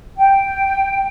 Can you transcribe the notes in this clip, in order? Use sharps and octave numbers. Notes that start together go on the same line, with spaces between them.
G5